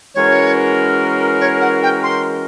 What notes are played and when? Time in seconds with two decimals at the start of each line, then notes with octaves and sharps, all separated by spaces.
0.14 E3 G#3 C#4 F#4 A#4 C#5
1.40 C#5
1.61 F#5
1.82 G5
2.03 C6